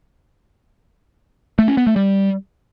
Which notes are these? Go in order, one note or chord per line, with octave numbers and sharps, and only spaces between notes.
A3
C#4
B3
A3
G3